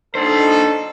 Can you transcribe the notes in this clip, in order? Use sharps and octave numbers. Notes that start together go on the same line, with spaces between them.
D4 D#4 A4 C5